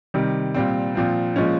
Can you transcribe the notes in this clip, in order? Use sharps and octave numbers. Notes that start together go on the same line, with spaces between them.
C3 D#3 G3
A#2 G3 C4
A#2 F3 C4
A#2 F3 G#3 C#4